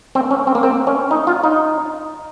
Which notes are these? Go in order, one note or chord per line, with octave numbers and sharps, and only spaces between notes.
C4
C#4
C4
A#3
C4
C#4
D#4
F4
D#4